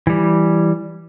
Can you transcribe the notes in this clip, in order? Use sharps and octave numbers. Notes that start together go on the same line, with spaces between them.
E3 G3